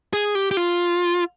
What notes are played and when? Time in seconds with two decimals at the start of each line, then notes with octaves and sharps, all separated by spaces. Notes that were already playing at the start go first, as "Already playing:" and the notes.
0.13 G#4
0.35 G4
0.51 G4
0.57 F4